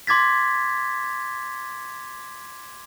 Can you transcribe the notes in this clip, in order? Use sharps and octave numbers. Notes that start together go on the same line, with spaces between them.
C6 D6 G#6 A6 B6